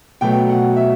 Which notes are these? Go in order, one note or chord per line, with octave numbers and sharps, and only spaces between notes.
B2 F#3 A3 G5
F#5
E5